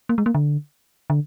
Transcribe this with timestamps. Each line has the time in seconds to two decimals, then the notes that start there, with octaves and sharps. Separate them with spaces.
0.09 A#3
0.18 G#3
0.26 A#3
0.35 D3
1.10 D3